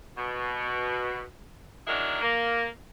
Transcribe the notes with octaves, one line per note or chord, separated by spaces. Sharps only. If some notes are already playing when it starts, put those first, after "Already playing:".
B2
D#3 F#3 G#3 D4 E4 A#4
A#3